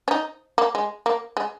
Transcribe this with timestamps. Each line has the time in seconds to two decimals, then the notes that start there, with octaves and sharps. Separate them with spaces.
0.08 C#4
0.11 D#4
0.58 A#3
0.75 G#3
1.06 A#3
1.37 G#3